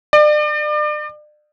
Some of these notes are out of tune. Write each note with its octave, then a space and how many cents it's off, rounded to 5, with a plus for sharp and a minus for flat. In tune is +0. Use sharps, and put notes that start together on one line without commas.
D5 +35